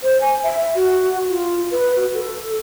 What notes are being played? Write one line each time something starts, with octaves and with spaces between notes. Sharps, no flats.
C5
G#5
E5
F#4
F4
B4
F#4
A4